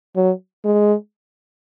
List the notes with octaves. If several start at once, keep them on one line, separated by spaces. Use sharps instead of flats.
F#3
G#3